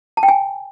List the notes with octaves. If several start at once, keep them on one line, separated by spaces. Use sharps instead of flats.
A5
G5
G#5